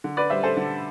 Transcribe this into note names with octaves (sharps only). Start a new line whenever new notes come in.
D3
B4 D5
G3 C5 E5
A4 C5
D3